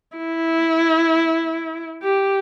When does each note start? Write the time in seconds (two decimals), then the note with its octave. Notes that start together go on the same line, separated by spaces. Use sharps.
0.17 E4
2.02 G4